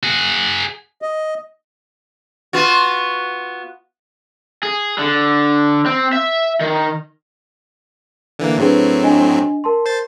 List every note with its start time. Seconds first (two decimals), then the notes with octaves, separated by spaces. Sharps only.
0.03 F#4 G#4
1.02 D#5
2.53 B3 F4 F#4
4.63 G#4
4.98 D3
5.86 C4
6.13 E5
6.60 D#3
8.39 D3 E3 A#3
8.58 A2 F#3 C4 D4 G#4 B4
9.03 D4 D#5 G#5
9.64 A#4 A5 C6
9.86 C5 A6